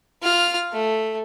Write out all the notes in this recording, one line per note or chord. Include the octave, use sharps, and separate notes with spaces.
F4 F6
A3